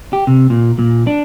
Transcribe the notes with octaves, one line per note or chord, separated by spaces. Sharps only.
G4
C3
A#2
A#2
D4